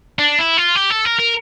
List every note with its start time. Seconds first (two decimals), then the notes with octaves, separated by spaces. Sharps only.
0.19 D4
0.39 E4
0.58 F4
0.76 G4
0.90 A4
1.06 A#4
1.19 A#4